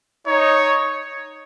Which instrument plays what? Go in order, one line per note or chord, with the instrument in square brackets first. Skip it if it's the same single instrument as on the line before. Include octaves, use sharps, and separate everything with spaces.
[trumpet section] D#4 [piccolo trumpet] C#5